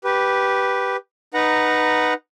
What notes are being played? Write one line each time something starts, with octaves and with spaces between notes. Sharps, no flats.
G4 B4
D#4 B4 F#5 A#5